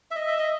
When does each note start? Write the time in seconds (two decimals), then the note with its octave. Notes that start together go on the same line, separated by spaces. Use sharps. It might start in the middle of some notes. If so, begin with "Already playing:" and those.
0.11 E5
0.16 D#5
0.28 E5
0.39 D#5